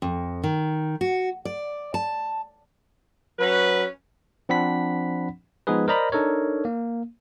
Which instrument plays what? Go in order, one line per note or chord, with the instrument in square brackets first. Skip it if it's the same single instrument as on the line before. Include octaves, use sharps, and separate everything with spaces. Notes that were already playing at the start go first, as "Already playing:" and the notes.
[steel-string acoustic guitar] F2
D#3
F#4
D5
A5
[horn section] F#3 C#4 B4
[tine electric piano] F3 C4 D4 F#5 B5 B6
F3 G#3 B3 D#4 G#4 B4
A#4 C5 D5 D#5 A#5 B5
D4 D#4 A4 A#4 C#5
A#3